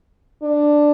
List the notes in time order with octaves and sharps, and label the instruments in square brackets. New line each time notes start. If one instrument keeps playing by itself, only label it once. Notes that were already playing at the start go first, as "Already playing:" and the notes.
[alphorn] D4